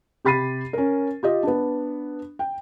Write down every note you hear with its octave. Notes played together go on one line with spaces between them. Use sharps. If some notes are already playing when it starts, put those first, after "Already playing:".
C3 G4 B5 A6 C7 D#7
C#4 A#4
F4 G4 D#5
B3 D4
G5